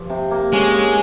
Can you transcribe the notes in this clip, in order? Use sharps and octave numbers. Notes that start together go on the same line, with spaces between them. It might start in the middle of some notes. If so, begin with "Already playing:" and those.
Already playing: G2 F3
C3
A#3
G#3 C#4
C#5